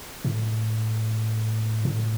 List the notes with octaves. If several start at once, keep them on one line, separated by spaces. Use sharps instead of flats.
A2
A2